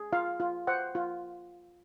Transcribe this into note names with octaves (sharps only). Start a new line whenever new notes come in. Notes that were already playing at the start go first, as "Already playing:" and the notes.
Already playing: G#4
F4 F5
F4
C5 F#5
F4